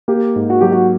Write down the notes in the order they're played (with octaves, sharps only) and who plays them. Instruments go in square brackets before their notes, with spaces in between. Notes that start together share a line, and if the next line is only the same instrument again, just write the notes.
[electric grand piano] A#3 [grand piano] G4
[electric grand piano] G#2
[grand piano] F#4
[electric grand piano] F#3 [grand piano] G4
[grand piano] F#4